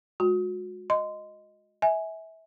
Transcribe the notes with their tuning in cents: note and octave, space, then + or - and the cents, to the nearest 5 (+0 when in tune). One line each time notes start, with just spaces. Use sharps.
G#3 +0 F#4 -30
D#5 +0 C6 -20
E5 -25 G#5 +5